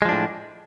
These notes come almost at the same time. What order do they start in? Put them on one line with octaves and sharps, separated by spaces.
G#3 F3 D4 A2